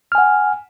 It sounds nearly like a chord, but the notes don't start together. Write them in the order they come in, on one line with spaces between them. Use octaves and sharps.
F6 G#5 F#5